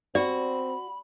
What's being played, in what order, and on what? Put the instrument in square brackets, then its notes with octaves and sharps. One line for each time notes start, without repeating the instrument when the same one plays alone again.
[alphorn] C4 [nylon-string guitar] F#4 [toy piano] D5 [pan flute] B5